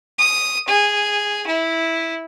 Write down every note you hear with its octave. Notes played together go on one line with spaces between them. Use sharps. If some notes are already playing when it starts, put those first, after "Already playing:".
D#6
G#4
E4